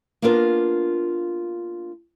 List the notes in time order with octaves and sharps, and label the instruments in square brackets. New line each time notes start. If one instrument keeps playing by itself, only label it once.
[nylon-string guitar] A#3 B3 D4 F4 A#4